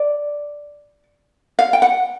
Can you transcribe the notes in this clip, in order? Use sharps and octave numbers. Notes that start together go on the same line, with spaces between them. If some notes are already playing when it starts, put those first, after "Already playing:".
Already playing: D5
F5
G5
F#5